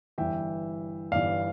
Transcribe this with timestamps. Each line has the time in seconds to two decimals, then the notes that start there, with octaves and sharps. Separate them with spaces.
0.18 G1 G2 E3 E5 G5
1.12 G1 G2 E3 D5 F5